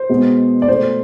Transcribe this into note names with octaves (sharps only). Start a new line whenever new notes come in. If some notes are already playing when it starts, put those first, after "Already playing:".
Already playing: C5
B2 G#3 B3
D5
B2 A3 C5